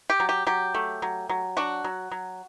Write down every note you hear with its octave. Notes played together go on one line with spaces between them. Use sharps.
G4
F#3
G4
F#3 G4
A3
F#3
F#3
D4 F#4
F#3
F#3